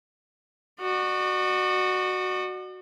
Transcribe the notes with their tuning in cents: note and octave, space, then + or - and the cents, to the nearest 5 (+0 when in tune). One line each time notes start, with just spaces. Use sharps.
F#4 +0 D5 +45